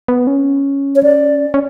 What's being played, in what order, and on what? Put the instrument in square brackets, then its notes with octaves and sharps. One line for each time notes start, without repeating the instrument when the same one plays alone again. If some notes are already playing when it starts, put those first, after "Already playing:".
[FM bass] B3
C#4
[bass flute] C#5
D5
[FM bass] C#4